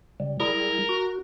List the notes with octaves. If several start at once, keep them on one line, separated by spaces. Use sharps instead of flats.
C#3 G3
G3 E4 G#4 A#4
F#4